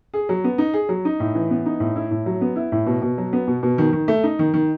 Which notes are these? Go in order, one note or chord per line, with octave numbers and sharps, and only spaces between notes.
G#4
F#3
B3
D#4
G#4
F#3
D#4
A2
E3
B3
D#4
A2
E4
A2
F#3
B3
E4
A2
B2
B2
F#3
B3
B2
B2
D#3
D#3
A3
D#4
D#3
D#3